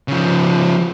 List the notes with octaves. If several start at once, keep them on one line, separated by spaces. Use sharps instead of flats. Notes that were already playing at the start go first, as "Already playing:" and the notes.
C#3 F3